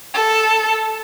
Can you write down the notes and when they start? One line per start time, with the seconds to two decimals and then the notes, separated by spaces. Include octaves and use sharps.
0.14 A4